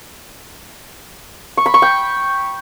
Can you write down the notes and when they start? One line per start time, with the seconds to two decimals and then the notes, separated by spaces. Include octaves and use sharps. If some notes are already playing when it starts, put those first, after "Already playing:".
1.57 C#6
1.66 B5
1.74 C#6
1.82 G5